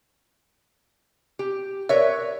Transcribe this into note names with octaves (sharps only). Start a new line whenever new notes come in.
G4
A#4 B4 C#5 D5 E5